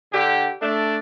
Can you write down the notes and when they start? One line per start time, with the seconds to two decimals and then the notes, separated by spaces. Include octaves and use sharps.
0.13 D3 G4
0.61 A3 D4